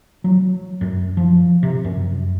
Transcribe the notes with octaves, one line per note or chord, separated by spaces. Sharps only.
F#3
F#2
F3
C3
F#2